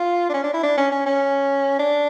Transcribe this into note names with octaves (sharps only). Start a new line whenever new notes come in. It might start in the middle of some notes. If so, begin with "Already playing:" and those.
Already playing: F4
D4
C#4
D4
E4
D4
C#4
C#4
C#4
D4